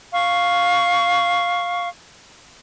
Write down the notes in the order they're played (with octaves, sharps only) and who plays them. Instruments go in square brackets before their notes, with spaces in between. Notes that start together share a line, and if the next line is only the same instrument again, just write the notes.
[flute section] F5 C#6